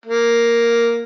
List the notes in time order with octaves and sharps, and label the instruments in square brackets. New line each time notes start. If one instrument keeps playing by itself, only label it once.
[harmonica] A#3